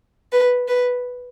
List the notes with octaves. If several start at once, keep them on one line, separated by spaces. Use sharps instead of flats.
B4
B4